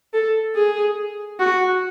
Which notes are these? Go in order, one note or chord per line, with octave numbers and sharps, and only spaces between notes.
A4
G#4
F#4